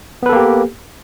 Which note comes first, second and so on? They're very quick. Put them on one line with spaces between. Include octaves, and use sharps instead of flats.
B3 B4 A4 A#3 G4